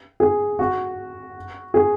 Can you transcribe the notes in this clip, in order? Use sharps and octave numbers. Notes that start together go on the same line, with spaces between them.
G#4
F#4
G#4